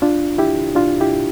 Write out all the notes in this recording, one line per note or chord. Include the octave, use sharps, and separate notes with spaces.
D4 F4
E4 G4
D4 F4
E4 G4